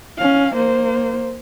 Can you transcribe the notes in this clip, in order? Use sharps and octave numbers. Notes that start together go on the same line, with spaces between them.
C#4 F5
A#3 C5